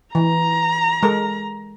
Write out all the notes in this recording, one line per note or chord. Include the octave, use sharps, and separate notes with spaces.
E3 A#5
G#3 A4 A#4